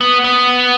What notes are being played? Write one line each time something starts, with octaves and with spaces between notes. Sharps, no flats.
B3
B3